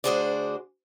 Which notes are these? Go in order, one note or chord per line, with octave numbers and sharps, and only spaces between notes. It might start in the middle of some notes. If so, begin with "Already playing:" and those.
D2 D4 F#4 G#4 C5 D5